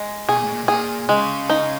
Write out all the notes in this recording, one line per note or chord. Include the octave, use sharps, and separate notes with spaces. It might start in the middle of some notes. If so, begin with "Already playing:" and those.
Already playing: G#3
B2 G#4
A#2
A2
A#2
A2
A#2 G#4
C#3 G#3
D#4